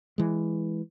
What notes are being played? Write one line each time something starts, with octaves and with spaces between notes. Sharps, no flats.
E3 G#3